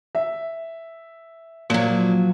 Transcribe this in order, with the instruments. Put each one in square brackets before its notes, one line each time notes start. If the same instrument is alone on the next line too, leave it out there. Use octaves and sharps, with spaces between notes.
[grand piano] E5
[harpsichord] A#2 [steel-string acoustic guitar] F3 F#3